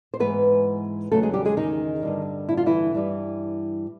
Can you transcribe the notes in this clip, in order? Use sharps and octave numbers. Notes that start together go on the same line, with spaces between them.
C5
G#2 E3 G#3 B3 B4
E2 C#3 F#3 A3 A4
G#3 G#4
G3 G4
G#3 G#4
D#3 D#4
G2 D3 G3
E4
F4
E3 E4
G2 E3 G3